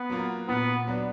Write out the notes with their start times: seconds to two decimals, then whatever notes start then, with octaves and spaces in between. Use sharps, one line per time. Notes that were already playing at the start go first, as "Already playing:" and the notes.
Already playing: B3
0.10 F#3 A#3 F4
0.48 A#2 B3
0.87 F#3 B3 D4